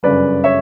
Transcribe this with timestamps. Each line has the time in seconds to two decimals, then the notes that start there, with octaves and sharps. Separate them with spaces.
0.03 G1 F#2 C#3 B4 D5
0.44 C#5 E5